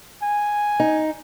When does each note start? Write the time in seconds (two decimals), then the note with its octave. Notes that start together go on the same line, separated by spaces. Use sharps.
0.22 G#5
0.80 D#4